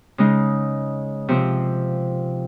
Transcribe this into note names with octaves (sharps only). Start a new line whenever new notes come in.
C#3 G#3 D#4
C3 F3 C4